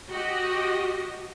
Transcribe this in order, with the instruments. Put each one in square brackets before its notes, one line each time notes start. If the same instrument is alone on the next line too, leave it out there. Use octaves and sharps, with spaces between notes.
[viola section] F#4 G4 D#5